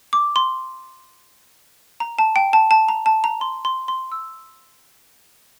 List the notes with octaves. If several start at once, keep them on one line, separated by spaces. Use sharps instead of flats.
D6
C6
A#5
A5
G5
A5
A5
A#5
A5
A#5
C6
C6
C6
E6